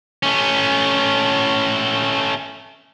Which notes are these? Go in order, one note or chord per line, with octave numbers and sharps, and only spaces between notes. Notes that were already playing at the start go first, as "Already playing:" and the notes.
A3 C#4